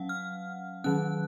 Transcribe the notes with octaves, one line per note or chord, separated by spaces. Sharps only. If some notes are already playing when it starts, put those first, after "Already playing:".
Already playing: F#3 C#4 F5 F#5
F6
D#3 F#3 C#4 F#6